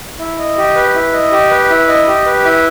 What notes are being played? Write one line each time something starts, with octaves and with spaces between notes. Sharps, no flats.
E4
D#5
G4
B4
E4
D#5
G4
B4
E4
D#5
G4
B4
E4